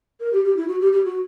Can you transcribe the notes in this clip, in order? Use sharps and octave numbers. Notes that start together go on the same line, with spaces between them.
A#4
G4
G4
E4
F#4
G4
G4
F#4